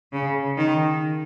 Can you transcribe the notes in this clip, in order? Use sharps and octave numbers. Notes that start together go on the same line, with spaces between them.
C#3
D#3